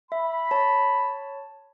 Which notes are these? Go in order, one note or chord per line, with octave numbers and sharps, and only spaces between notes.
E5 B5
C#5 A5